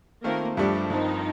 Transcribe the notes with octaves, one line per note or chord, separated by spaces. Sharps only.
D#3 A3 A#3 C4 F4 A#4
G2 F3 G3 A3 D4 G4
G2 D#3 F3 C4 D#4